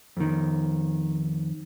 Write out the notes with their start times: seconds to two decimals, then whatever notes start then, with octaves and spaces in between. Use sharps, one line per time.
0.17 F2 D#3